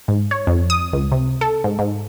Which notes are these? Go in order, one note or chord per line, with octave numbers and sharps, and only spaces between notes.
G#2
C#5
F2
D#6
C#2
C3
A4
G#2
G#2